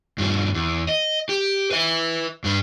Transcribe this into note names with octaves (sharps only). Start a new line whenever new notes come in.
G2 F3
E2
D#5
G4
B4 E5
G2 B4